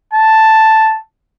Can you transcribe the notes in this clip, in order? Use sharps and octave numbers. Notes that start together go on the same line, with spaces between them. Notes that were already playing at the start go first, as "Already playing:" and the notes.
A5